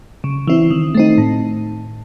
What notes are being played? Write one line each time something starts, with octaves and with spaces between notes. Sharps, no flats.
C#3
E3 C4 E4
D#3
A3 C4 D#4
A2